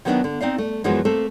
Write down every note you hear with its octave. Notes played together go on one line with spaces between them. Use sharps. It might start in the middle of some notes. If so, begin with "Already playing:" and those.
D#3 F#3 A3 B3 D4 D#4
D3
C4 D#4 D5 F5
A3
F#2 E3 F3 G#3 B3 F#4
A3 A#3 C4 A4